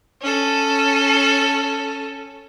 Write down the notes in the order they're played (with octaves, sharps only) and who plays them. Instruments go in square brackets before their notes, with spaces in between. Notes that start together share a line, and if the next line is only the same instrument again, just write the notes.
[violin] C#4 A4